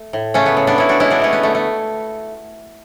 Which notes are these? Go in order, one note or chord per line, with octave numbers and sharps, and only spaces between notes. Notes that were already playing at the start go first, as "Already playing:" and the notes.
Already playing: A3
A2
C#3 A3 C#4
B3
C#3
B3 D4
C#3 C#4 E4
D4 F#4
G#3 C#4 E4
B3 D4
D3 A3 C#4
B3
D3 A3
A3